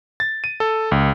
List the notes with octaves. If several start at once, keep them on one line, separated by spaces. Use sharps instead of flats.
A6
D#7
A4
C#2